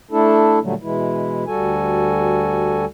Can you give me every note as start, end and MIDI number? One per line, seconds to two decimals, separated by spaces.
0.11 0.59 57
0.11 0.59 62
0.11 0.59 64
0.11 0.59 69
0.62 0.74 46
0.62 0.74 50
0.62 0.74 54
0.62 0.74 55
0.62 0.74 57
0.82 1.44 47
0.82 1.44 52
0.82 1.44 56
0.82 1.44 64
1.47 2.85 38
1.47 2.85 55
1.47 2.85 66
1.47 2.85 69
1.47 2.85 80